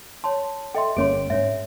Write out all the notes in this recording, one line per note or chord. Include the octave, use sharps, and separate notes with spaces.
C#5 A5 C6
A4 D#5 E5 G5 C6
G1 A#3 C#4 G#4 C#5 C6 D7
G#2 D4 C#5 E5